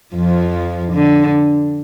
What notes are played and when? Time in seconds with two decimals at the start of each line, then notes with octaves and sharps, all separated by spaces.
0.16 F2 F3
0.93 D3